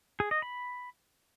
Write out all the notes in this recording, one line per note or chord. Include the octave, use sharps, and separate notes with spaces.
G#4
D#5
B5